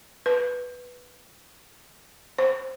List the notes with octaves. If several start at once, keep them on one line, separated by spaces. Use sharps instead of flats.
B4
C5